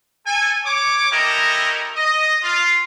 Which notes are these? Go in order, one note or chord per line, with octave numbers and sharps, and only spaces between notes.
A4 G#5
C#5 D6
C#4 E4 G4 A4 A#4 D#5
D#5
F4